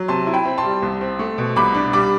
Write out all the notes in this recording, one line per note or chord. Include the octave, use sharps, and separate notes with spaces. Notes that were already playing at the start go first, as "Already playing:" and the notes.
Already playing: F#3
C3 A5 C6
E4
G5 B5
C4
A5 C6
G3
C2
C4
A3
B2
C2 B5 D6
D4
G3 B5 D6